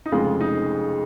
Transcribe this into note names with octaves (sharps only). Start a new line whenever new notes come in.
D#4
F1 F2 C#3 G#3 F4
D#4